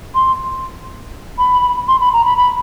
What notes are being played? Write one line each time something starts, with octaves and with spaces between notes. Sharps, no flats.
C6
B5
C6
B5
A#5
B5
B5